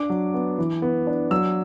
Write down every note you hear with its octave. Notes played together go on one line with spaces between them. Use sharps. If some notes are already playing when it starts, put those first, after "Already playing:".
Already playing: D4 D6
F#3
B3
E3
B3
D4
F#3 E6